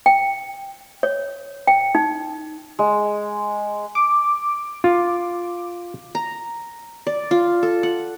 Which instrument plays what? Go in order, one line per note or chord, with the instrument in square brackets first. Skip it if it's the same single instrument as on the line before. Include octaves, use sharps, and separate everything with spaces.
[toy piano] G5
C#5
G5
D#4
[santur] G#3
[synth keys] D6
[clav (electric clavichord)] F4
[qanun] A#5
D5
F4
A4
F#5